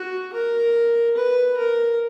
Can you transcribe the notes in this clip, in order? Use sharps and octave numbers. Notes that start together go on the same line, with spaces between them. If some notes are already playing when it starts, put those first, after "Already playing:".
Already playing: F#4
A#4
B4
A#4